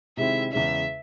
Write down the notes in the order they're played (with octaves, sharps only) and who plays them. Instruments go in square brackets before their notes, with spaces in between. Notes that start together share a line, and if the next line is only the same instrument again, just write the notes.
[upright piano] C3 D#3 G#3 C4 E4 [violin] E5
[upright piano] E2 C#3 G#3 C#4 [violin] E5